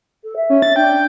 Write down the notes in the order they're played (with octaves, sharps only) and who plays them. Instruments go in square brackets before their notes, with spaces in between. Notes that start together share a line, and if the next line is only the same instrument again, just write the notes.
[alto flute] A4
E5
[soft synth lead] C#4
A6
[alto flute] D4 [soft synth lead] G5